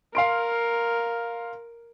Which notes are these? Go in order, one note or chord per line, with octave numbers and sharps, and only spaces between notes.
A#4 F5 C6 D7